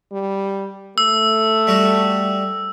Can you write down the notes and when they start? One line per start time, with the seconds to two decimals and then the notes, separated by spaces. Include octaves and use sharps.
0.12 G3
0.98 A3 E6
1.67 G3 F#4